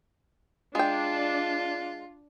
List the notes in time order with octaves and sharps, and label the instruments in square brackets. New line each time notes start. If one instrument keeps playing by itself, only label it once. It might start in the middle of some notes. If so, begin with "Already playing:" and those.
[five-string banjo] G#3 G5 [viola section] D4 [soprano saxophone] F4